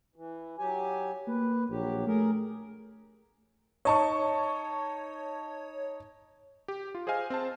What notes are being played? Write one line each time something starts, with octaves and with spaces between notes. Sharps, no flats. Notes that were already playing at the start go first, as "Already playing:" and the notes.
E3
F#3 G4 G#5
A#3 B4
A#1 F#3 G4
A3 G#4 A#4
D#4 C#5 A5 C#6
G4
F4
G#4 C5 D#5 F5 G#5 F6
C4 C5 A5